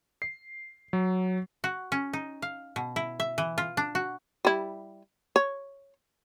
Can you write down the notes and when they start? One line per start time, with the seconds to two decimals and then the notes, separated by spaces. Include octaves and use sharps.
0.22 C7
0.93 F#3
1.64 F#4
1.92 C#4
2.13 D#4
2.42 F5
2.76 B2
2.96 E4
3.20 E5
3.38 E3
3.58 F4
3.77 D4
3.95 F#4
4.45 G3 E4
5.36 C#5